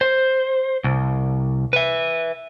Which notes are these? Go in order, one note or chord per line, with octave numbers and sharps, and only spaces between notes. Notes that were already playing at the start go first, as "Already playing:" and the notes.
C5
C2
B4 E5